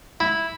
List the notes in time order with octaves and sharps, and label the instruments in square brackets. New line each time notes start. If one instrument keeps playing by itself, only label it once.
[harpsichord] E4